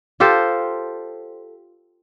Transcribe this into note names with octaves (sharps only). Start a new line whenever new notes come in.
F4 G4 A4 C5